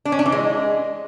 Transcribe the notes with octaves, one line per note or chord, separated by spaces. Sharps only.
D4
C#4
D4
E3
G#3